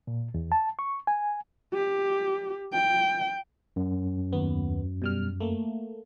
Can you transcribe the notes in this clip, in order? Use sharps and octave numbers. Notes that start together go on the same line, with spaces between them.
A#2
E2
A5
C#6
G#5
G4
G5
F#2
D#2 B3
B2 G3 F6
A3 A#3